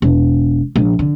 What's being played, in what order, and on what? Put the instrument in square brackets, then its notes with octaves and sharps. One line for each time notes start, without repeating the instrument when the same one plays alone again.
[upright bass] E1
A#1
D3